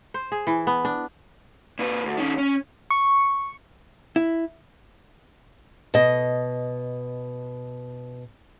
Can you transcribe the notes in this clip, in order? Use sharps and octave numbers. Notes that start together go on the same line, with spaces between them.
C5
G#4
E3
B3
D4
A#2 B4
D2
D#3 C#4
C#4
C#6
E4
B2 D#5